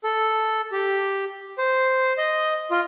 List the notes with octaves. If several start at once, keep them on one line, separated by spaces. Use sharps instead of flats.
A4
G4
C5
D#5
F4